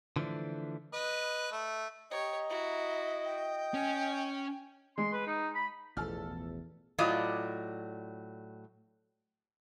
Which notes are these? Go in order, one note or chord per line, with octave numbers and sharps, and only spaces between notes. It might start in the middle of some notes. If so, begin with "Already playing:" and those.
D3 E3 F3 A3 D4
B4 D#5
A3
G4 C#5 D#5 A#5
E4 F#4
G5
C#4 G#5
G#3 C6
B4
D#4
B5
A1 E2 B2 F3 A4 F6
A2 F#3 F4 D5 D#5